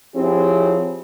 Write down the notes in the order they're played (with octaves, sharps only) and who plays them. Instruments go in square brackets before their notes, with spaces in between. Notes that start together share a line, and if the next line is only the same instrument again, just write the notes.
[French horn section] F3 C4 E4 G4 G#4 C#5